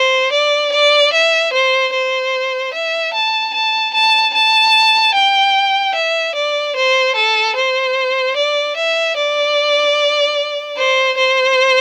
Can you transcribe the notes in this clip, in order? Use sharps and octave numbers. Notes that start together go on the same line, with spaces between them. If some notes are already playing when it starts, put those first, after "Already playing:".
Already playing: C5
D5
D5
E5
C5
C5
E5
A5
A5
A5
A5
G5
E5
D5
C5
A4
C5
D5
E5
D5
C5
C5